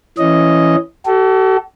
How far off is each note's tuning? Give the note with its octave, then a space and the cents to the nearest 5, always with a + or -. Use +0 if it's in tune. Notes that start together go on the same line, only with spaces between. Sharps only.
E3 +15 C#4 +0 D#5 +0
F#4 +45 A4 +0